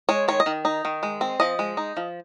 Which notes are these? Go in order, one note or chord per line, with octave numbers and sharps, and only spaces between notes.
G#3 C#5
D#3 C#5
D#5
D#3
D#4
D#3
G#3
C4
F3 D#5
G#3
D#4
F3